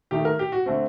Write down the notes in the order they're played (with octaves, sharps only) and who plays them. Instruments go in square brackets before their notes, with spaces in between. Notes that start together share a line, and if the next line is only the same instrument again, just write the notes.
[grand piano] D#3 A3 D#4 G4
A#4
G4
F#4
D3 A3 C4